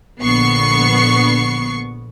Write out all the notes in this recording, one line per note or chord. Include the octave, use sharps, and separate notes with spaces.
A#1 D3 B3 C#6 C7 C#7